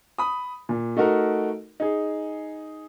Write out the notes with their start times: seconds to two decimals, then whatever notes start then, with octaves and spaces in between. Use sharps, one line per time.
0.18 B5 D#6
0.69 A#2
0.97 A3 D#4 F#4 A#4
1.80 D#4 G#4